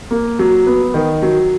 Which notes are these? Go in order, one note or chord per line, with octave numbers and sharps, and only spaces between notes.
A#3
F#3
B3
D#3
F#3